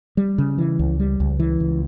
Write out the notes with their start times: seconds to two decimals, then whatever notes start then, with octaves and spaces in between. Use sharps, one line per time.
0.17 G3
0.38 C#3
0.58 E3
0.79 C#2
1.00 G3
1.20 C#2
1.39 E3
1.60 C#2